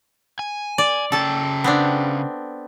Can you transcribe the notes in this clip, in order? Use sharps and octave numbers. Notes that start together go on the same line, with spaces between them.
G#5
D5
C#3 C#4 A4 G5 A5
B3 C4 D4